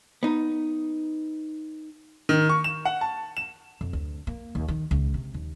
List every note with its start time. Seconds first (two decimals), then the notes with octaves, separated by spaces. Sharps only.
0.23 B3 D#4
2.29 D#3
2.49 C#6
2.64 E7
2.85 F#5
3.01 A5
3.37 E7
3.81 F2
3.93 D2
4.27 A#3
4.55 D#2
4.68 D#3
4.91 C#2
5.14 C3
5.34 D#2